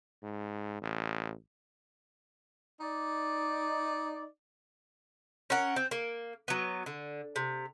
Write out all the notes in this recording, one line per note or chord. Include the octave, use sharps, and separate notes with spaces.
G#2
A1
D#4 D5
C#4 A#4 F#5
C4
A#3
F#3 B3
D3
C3